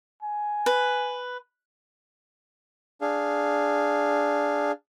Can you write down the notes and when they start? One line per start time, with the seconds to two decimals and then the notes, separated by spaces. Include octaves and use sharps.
0.22 G#5
0.66 B4
3.01 D4 G#4 F5